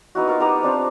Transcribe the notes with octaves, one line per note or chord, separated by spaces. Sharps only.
B3 D#4 E4 F#4
F4 A#4 C#6
B3 D#4 G4 A#5
C4 D4 F4 C5